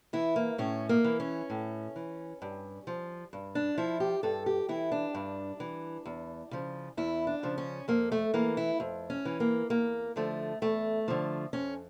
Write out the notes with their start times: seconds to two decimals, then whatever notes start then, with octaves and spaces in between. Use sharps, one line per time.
0.13 E3 E4
0.36 A#3
0.58 A2 C#4
0.89 A#3
1.04 E3
1.20 C#4
1.50 A2
1.96 E3
2.42 G2
2.87 F3
3.33 G2
3.55 D4
3.77 F3 E4
4.00 G4
4.23 G2 A4
4.46 G4
4.69 E3 E4
4.92 D4
5.15 G2
5.60 E3
6.06 E2
6.51 C#3 F3
6.97 E2 E4
7.27 D4
7.43 C#3 F3
7.58 C#4
7.88 F2 A#3
8.12 A3
8.34 E3 A#3
8.57 E4
8.80 F2
9.10 C#4
9.25 E3
9.40 A#3
9.70 E2 A#3
10.16 D3 F3 A3
10.62 E2 A3
11.08 D3 F3
11.53 F2 C#4